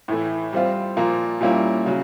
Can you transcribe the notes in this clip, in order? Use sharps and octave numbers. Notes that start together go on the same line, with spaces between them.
A2 E3 A3
G3 C4 F4
A#2 F3 A#3
A#2 G3 A#3 C#4 E4
C#3 F#3